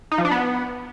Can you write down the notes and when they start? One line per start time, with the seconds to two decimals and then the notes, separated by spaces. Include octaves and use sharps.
0.12 D#4
0.18 F3
0.25 D4
0.31 B3